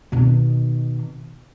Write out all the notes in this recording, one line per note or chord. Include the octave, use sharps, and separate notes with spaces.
B2 D#3